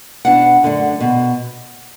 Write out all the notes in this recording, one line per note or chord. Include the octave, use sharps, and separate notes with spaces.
B2 B3 D4 F#5
F#2 D3 A3 D4
B2